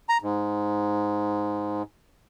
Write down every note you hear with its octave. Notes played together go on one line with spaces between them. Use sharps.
A#5
G#2